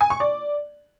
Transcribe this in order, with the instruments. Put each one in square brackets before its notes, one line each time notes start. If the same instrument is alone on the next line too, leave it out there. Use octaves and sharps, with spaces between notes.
[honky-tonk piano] G#5
C#6
D5